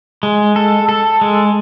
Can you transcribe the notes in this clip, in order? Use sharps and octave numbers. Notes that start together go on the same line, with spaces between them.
G#3
A4
A4
G#3